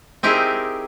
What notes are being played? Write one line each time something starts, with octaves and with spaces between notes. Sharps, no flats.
C4 D#4 E4 G4 G#4 A#4